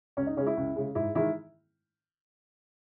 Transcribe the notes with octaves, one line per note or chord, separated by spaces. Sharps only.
C#2 C#4
D#4
C#3 G#3 C#4
E4
C#2
C#3 G#3
G#2 E4
D#3 G#3 E4